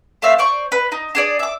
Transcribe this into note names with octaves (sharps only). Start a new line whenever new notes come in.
A3 C4 E5 F5
C5 D5 C#6
B4
D#4
D4 G#4 D5
E5 D6